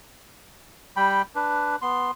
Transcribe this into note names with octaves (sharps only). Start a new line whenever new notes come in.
G3 G5 B5
D4 B4
B3 C6